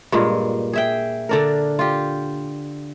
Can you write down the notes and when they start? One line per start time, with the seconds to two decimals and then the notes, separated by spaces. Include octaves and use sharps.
0.12 G2 A#2 G#3
0.73 G#4 E5 G5
1.29 D3 D4 A#4
1.79 F4 G4